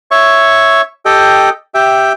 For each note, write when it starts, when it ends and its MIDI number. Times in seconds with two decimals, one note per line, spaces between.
0.11 0.81 73
0.11 0.81 76
0.11 0.81 85
1.05 1.49 67
1.05 1.49 69
1.05 1.49 75
1.05 1.49 79
1.74 2.13 67
1.74 2.13 76
1.74 2.13 79